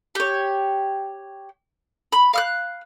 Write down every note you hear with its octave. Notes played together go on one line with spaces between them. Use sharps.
G4 C#5
B5
F5 F6 F#6